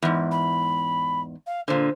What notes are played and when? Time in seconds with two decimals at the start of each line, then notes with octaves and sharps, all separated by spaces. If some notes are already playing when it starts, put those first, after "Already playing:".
0.02 E2 G#2
0.31 B5
1.47 F5
1.68 A#2 D3 C5